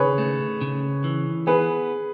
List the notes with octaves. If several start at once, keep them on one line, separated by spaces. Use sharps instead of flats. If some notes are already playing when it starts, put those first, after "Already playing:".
Already playing: C#3 G#4 B4 C#5
A3
C#3
E3
B3 G#4 B4